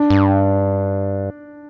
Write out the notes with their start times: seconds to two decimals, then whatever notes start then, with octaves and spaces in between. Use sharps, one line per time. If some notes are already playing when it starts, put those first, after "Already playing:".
Already playing: D4
0.10 G2